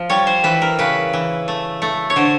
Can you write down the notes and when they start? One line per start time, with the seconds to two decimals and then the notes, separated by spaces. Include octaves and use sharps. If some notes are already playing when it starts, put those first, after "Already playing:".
Already playing: F3
0.09 G3 C#5
0.27 C5
0.44 E3 B4
0.62 A#4
0.79 C#3 B4
1.13 E3
1.48 A3
1.82 A3
2.10 C#5
2.16 D3 C5